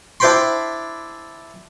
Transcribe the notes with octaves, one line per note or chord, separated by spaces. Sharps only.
D4 E4 C5 G5 B5 C6